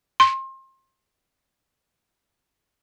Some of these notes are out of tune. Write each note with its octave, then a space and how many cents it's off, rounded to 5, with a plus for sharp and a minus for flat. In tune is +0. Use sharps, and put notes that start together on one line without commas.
C6 +30